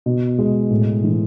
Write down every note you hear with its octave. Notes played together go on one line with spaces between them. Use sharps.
B2
G#3
A2
E3